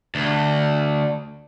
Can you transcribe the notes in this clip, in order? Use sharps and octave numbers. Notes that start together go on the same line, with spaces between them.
D2